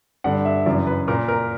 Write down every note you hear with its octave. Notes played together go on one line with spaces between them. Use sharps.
G2 D3 F#5
E5
F#2 C#3 E3 D5
B4
A#2 A#4
A#4